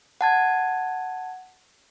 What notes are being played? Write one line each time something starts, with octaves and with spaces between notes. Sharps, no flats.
F#5 A5 G#6